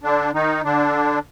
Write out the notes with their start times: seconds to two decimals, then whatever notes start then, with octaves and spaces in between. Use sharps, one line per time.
0.03 D3 D4
0.34 D#3 D#4
0.64 D3 D4